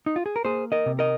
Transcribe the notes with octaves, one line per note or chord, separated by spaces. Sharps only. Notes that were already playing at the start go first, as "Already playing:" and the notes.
D#4
F4
G#4
A#4
A#3 G#4 C5
A#4 D#5
C3
A#4 D#5